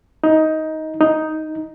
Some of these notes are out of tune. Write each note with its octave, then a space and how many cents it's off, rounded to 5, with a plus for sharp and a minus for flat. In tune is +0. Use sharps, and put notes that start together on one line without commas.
D#4 +15
D#4 +5